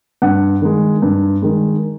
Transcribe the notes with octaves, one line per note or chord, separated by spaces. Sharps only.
G2 F#5
D#3 G#3
G2
D#3 G#3